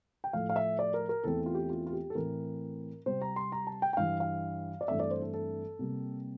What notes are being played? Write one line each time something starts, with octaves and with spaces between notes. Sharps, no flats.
G5
A2 F3 A3 F5
F5
E5
D5
A#4
A#4
E2 E3 A3 C4 A4
F4
G4
F4
F4
G4
A4
A2 E3 A3 C4 A#4
C3 G3 C4 C5
A#5
C6
A#5
A5
G5
G5
G2 E3 G3 F5
F5
D5
G2 E3 A3 C4 E5
D5
C5
A4
A4
C3 G3 A#3